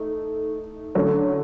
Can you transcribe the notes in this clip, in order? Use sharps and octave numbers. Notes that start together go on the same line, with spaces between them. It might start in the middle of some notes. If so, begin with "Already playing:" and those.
Already playing: A3 D#4
D3 F#3 A3 C#4